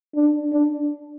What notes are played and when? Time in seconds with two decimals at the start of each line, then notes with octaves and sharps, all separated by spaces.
0.15 D4
0.52 D4